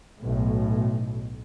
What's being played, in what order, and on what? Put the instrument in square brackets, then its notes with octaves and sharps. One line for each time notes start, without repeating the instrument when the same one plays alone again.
[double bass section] B1 A2